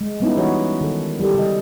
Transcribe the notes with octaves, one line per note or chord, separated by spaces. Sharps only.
G#3
G3 G#3 B3 C#4 D#4 E4
E3 F#4 C#5
D#3 A4
G3 E4 G4 A4
C#3 D#5